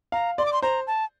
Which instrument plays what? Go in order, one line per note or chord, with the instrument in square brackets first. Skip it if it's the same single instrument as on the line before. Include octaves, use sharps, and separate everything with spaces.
[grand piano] F5 [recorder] A#5
[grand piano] D5 [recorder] C6
[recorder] D6
C6
[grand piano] C5 [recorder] A#5
[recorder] A5